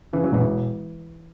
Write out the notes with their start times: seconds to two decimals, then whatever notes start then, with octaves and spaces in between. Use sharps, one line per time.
0.13 C#3 E3
0.24 F#3
0.32 E1 E3